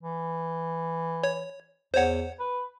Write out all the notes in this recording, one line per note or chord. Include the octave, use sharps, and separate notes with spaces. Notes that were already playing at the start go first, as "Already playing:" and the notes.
E3
C#5
E2 C5 C#5 F#5
B4